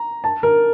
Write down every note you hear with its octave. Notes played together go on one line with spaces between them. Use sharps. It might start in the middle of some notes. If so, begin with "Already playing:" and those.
Already playing: A#5
A5
A#4